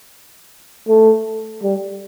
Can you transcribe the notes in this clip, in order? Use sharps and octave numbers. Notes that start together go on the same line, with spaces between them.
A3
G3